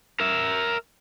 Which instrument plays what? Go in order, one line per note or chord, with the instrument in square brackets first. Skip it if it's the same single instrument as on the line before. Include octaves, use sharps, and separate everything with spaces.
[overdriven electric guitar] A#4 E5